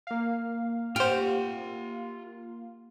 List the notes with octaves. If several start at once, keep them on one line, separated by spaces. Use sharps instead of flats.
A#3 F5
F4 G4 C5 F#5 F6